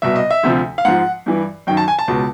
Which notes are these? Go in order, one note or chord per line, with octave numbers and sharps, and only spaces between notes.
C2 B2 E5
D#5
E5
D2 C3 F3
F5
G#2 F3 F#5
G2 E3
F#2 D#3 G5
A5
G#5
A5
C#2 B2